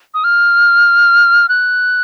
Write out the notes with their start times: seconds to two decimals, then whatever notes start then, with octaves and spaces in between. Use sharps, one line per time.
0.14 D#6
0.24 F6
1.49 F#6